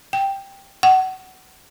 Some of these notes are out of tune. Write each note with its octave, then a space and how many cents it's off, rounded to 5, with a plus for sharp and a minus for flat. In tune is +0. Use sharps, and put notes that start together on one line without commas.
G5 +0
F#5 +25